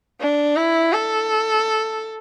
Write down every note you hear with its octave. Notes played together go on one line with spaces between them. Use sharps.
D4
E4
A4